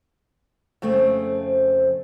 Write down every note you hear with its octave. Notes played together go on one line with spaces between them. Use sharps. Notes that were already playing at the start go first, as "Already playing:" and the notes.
F2 C#3 A3 C4